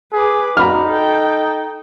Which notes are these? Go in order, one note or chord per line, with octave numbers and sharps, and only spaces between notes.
G#4 B4 D6
D4 D#4 F#4 A#5 B5 F6
A4 G5